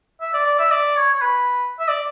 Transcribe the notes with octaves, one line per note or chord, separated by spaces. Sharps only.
E5
D5
D5
E5
D5
C#5
C#5
B4
E5
D5